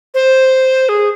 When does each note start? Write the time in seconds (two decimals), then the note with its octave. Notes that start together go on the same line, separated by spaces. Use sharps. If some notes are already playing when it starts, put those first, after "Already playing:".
0.14 C5
0.89 G#4